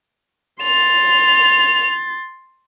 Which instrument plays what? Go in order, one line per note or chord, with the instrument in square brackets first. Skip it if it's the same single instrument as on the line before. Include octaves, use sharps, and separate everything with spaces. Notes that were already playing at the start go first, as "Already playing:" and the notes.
[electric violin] C6 A6 [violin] F7